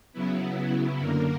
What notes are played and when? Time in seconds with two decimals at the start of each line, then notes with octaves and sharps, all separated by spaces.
0.13 C#3 F#3 B3 E4
0.99 F#2 D3 A#3 A#4